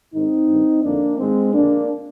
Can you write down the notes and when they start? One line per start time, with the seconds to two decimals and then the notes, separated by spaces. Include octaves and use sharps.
0.15 G#2 D#3 C4 D#4
0.50 G2 D#3
0.84 F2 D3 A#3 D4
1.18 G#2 D#3 G#3 C4
1.53 F2 D3 A#3 D4